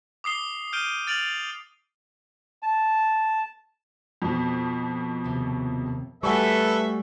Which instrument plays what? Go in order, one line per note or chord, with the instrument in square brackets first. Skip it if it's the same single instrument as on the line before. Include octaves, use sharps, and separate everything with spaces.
[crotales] D6 D#6 C7 G7
F6 G6 D7 D#7 G7
F6 A6 D7 F7 F#7
[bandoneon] A5
[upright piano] F2 B2
[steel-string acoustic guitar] D#2 C3
[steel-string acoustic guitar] G3 A3 [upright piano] F#4 G#5 C#6 [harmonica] A4 B4 E5